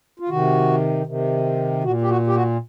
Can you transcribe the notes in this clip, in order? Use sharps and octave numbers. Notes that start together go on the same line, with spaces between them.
F4
C3 D#3 F#4
C3 D#3
A#2 F#4
G4
F#4
G4
F#4